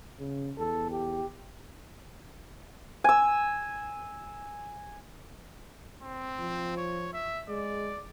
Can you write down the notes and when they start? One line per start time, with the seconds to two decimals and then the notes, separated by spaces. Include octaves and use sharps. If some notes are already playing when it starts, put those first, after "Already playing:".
0.19 C#3
0.58 E2 A4
0.91 G4
3.04 G#5 E6
6.03 C4
6.40 F3
6.77 C#5
7.13 E5
7.49 G#3 D5